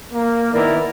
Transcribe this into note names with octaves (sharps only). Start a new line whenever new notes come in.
A#3
D#3 B3 E4 A#4 D5